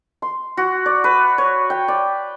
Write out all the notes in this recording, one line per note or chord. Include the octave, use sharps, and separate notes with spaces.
C6
F#4
D5
B4
C#5
G5
D5